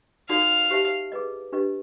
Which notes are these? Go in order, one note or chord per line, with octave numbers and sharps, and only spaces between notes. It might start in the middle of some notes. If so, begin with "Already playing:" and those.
D#4 F#4 A4 D5 F5
G4 C5 E5 A5
G#4 B4 D#5
D4 G4 B4 D#5